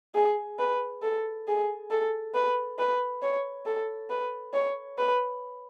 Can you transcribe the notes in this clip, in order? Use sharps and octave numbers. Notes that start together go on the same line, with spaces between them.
G#4
B4
A4
G#4
A4
B4
B4
C#5
A4
B4
C#5
B4